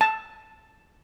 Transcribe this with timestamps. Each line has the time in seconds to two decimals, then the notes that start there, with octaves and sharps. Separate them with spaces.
0.01 A5